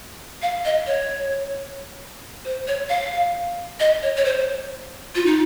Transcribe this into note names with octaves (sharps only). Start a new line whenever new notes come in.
F5
D#5
C#5
C5
C#5
F5
D#5
C#5
C#5
C5
F4
D#4